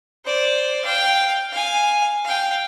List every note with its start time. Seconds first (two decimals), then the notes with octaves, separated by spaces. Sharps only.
0.25 C5 D5
0.84 F5 G5
1.52 F5 G#5
2.24 F5 G5